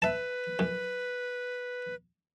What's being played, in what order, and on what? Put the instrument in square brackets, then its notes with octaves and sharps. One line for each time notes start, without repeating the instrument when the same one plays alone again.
[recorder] B4 [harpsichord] E5 A5
[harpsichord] F#2